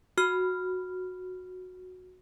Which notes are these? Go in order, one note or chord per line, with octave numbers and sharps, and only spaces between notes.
F#4 F6